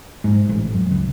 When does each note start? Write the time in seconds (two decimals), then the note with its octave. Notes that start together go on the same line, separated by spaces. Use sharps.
0.24 G#2
0.49 A1
0.73 F#2
0.91 C#2